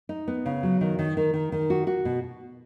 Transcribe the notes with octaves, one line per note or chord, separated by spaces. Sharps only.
D#4
B3
C#3
F#3
D#3
D#3
D#3
D#3
D#3
F#4
F#4
B2